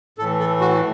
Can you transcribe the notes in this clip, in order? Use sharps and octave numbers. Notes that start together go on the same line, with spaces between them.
A2 E3 A4
A4
F#4